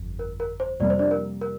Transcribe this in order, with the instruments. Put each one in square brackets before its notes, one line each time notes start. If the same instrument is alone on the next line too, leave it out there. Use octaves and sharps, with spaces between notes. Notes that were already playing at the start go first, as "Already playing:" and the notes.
Already playing: [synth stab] G1 F2
[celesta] A#4
A#4
C5
[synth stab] F2 C3 G3 A#3 [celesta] D5
[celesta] C5
D4 D5
A#4
A#4